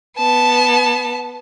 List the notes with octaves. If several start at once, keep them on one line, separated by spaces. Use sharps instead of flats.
B3 A5